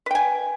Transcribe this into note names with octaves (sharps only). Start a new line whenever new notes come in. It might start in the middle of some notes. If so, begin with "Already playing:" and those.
B4 G5 G#5